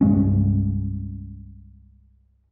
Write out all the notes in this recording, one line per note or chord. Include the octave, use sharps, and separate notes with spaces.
C2 G2 G#3 C#4